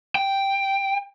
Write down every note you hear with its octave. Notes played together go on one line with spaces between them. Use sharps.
G5